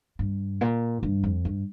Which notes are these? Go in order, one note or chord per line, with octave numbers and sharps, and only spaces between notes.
G2
A#2
G2
F2
G2